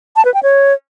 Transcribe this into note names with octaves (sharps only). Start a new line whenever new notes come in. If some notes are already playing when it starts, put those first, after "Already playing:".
A5
B4
G5
C#5